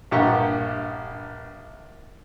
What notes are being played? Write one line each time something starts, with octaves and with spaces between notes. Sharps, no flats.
A#1 G2 G4 F#5 A#5 C#6